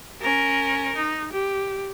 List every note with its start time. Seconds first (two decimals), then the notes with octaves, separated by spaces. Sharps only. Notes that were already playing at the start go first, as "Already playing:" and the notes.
0.22 C#4 A#4
0.96 D#4
1.32 G4